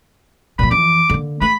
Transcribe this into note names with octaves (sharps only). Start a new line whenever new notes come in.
A#2 F3 B5
F2 E3 D6
D3 A#3
A3 B5